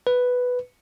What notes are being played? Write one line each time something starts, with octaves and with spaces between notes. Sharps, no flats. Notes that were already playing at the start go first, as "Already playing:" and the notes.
B4